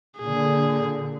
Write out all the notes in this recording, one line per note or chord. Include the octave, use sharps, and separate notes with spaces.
A#2 D3 G#4